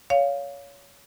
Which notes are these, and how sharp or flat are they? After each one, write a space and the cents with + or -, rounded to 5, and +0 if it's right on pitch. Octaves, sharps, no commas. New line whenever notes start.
C#5 +25 F5 +0